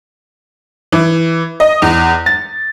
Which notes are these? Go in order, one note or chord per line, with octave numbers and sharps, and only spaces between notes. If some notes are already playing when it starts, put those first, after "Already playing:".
E3
D#5
E2
A6